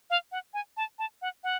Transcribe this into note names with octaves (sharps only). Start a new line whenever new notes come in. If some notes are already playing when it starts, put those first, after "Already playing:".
F5
F#5
G#5
A5
A5
F#5
F#5